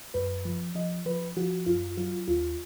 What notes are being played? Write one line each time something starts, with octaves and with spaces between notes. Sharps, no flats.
F#2 B4
F3
F3 D#5
F3 B4
F3 F#4
F#2 F4
F#3 F4
D#2 F4